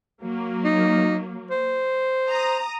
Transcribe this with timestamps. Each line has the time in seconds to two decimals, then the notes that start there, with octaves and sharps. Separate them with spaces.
0.22 F#3 A#3
0.64 D#4
1.51 C5
2.29 A#5 D#6